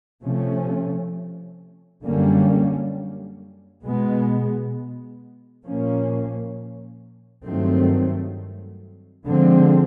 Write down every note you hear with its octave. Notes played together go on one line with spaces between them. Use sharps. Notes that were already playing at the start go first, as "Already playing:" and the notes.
C3 F3 A3 C#4
F#2 D3 G3 A#3 C#4
B2 G#3 B3
A#2 F3 A#3 C#4
G2 D#3 F#3 A3 C4
D3 F3 G#3 C4